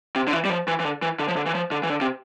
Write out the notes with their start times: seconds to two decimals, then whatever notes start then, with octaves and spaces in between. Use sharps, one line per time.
0.16 C3
0.28 D3
0.33 E3
0.45 G3
0.50 F3
0.68 E3
0.80 E3
0.85 D3
1.02 E3
1.19 D3
1.28 F3
1.36 D3
1.46 E3
1.55 F3
1.71 D3
1.83 E3
1.90 D3
2.01 C3